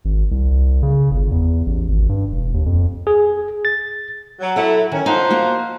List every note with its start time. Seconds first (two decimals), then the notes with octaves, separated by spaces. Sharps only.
0.05 G#1
0.31 C2
0.83 C#3
1.11 G1
1.31 E2
1.66 A1
1.88 G#1
2.09 G2
2.32 E1
2.54 D#2
2.66 F2
3.07 G#4
3.65 A6
4.39 F#3
4.56 F#3 E4 A4 F#5
4.92 D#3 C#4
5.06 F3 D#4 C5 F#5
5.31 A#3 F#4